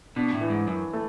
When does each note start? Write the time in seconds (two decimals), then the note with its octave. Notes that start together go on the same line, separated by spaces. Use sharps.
0.16 B2 D4
0.33 A2
0.41 E3
0.50 G#2
0.67 F#2 E3
0.93 A3